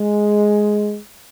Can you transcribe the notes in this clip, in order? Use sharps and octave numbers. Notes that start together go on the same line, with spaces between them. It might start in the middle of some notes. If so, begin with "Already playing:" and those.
Already playing: G#3